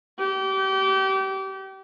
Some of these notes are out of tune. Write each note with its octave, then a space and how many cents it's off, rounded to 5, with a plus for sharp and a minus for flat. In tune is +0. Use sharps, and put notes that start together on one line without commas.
G4 -30